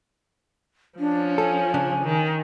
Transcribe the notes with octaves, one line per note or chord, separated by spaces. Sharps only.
F3 C#4 D4
A4 G#5
C#3 D4
D#3